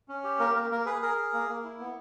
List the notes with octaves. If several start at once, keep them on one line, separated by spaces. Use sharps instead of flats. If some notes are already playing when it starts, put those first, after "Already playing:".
C#4
G4
A#3 A#4
A#3 A#4
A#3 A#4
G#4 B4
G#4 A#4
G#4
A#3
A#3
E4
B3